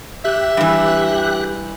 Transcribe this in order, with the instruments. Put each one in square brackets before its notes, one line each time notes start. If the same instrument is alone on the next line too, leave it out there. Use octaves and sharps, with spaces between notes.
[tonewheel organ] G4 F#6 [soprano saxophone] E5
[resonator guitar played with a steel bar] G2 E3